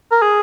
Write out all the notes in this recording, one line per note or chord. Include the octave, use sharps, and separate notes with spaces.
A#4
G#4